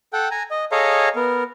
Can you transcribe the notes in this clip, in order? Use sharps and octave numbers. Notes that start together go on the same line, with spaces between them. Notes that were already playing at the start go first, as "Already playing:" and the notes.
A4 F#5 G5
G#5 A#5
D#5
G#4 A4 C#5 D#5 F5 A#5
B3 A#4